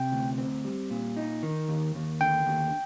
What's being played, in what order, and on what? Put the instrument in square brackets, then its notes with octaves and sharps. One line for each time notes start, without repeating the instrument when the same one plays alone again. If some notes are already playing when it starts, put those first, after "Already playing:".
Already playing: [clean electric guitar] C3 [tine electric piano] G5
[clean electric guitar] D2
C4
G3
A#2
D#4
D#3
D#2
D#2
[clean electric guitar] D3 [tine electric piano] G5
[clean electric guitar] D#2